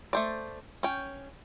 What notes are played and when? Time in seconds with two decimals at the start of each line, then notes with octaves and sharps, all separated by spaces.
0.13 A3 C5 D5
0.83 C#4 G5